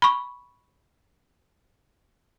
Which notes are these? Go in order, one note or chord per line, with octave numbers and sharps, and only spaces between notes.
B5 C#6